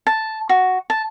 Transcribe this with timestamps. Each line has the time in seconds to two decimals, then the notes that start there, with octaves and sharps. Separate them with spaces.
0.07 A5
0.49 F#4
0.90 A5